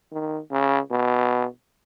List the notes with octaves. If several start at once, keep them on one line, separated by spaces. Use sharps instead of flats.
D#3
C#3
B2